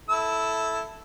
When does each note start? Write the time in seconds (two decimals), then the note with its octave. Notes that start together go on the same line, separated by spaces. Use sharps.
0.09 E4 A4 E6